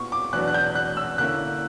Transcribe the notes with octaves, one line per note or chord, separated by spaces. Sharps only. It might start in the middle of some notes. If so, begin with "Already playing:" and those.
Already playing: A#2 B3 E4 C#6
D6
E2 B2 F#3 B3 D4 F#6
F#6
G6
F#6
E6
D3 A#3 C#4 E4 F#6